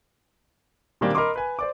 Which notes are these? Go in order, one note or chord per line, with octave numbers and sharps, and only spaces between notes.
A#2 D#3 G3 A#3 C4 D4
A#4 D#5 B5 C6 D6 D#6
B4 G#5
C5 D5 D6